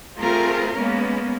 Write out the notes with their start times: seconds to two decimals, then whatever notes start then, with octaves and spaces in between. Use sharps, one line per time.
0.20 A3 C4 F4 G#4 A#4
0.75 G#3 A#3 B3 C#4